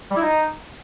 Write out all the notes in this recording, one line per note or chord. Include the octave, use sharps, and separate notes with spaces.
G3
E4
D#4